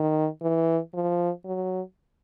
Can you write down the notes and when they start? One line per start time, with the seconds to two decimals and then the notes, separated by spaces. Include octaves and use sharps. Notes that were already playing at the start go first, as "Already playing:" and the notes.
Already playing: D#3
0.42 E3
0.94 F3
1.45 F#3